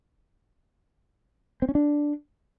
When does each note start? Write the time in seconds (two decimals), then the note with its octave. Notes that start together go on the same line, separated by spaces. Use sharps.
1.62 C4
1.69 C#4
1.75 D4